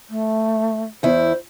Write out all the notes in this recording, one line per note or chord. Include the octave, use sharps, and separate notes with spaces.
A3
E2 E4 C5